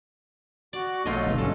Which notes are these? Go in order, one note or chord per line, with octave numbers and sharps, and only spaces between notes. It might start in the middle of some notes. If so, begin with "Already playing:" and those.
F#4 D5
B1 F#3 A3 F4 D#5
G1 G#2 B2
G#1 G2 D3 C#4 A4